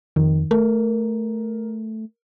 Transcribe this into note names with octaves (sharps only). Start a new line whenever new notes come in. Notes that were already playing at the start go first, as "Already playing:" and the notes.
F2 D#3
A3 A#4